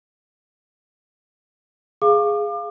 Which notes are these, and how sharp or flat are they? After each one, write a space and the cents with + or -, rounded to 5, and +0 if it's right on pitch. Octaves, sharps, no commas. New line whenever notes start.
G#4 +0 F5 +0 D6 +35